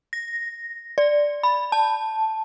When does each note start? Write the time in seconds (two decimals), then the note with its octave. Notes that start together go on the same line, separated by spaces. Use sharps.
0.13 A#6
0.98 D5
1.43 B5
1.72 A5